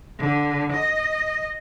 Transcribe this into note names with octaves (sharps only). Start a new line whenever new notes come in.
D3
D#5